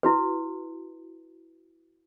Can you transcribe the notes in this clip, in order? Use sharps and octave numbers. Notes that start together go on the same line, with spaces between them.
E4 F#4 B4